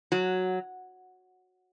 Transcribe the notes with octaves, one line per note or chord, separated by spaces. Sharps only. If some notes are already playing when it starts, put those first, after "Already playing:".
F#3